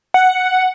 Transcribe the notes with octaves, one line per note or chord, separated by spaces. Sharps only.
F#5